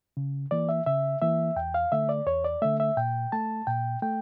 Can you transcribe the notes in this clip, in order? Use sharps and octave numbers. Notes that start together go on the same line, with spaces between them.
C#3
E3 A#3 D5
E5
C#3 E5
E3 A#3 E5
E2 G5
F5
D3 A3 E5
D5
E2 C#5
D5
D3 A3 E5
E5
A#2 G5
A3 A5
A#2 G5
A3 G5